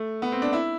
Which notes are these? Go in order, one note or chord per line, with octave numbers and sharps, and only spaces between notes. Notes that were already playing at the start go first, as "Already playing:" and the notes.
Already playing: A3
B3
C4
D4
E4